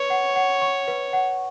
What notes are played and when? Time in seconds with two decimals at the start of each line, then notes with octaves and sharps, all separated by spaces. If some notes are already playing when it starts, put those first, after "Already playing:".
Already playing: B4 C#5
0.10 F#5
0.36 F#5
0.62 C#6
0.88 B4
1.13 F#5